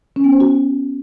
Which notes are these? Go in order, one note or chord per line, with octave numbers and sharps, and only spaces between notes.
C#4
B3
C5
F#4